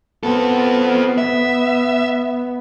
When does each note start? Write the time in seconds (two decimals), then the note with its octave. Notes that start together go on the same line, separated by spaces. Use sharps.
0.23 B3 C4 A4
1.18 E5